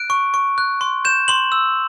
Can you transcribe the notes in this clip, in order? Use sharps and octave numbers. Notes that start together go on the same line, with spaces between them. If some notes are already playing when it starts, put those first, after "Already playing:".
Already playing: F#6 D7
C#6
C#6
F#6
C6
G6 E7
C6 F#7
E6